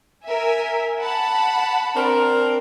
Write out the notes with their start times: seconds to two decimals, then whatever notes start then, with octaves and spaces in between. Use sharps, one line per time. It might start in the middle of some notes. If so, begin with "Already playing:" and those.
0.23 A#4 E5 G#5
1.00 F#5 A5 B5
1.95 C4 D4 A#4